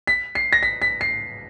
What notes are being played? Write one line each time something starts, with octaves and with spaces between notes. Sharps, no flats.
B6
C7
A#6
B6
B6
C7